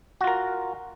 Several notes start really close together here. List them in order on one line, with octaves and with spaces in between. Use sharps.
F#4 F4 A#4